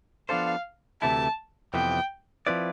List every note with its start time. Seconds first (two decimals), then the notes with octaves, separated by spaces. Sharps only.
0.29 F3 B3 D4 A4 C5 F5
1.02 D2 C3 E3 A3 E4 A5
1.74 F2 C3 E3 B3 G5
2.47 F3 C4 E4 B4 D5